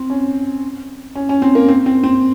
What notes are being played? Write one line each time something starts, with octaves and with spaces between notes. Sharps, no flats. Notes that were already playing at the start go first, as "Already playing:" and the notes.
Already playing: C4
C#4
C#4
C#4
C4
A#3
C4
C4
C4